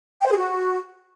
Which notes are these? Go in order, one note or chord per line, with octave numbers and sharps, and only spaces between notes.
G5
C5
G#4
F#4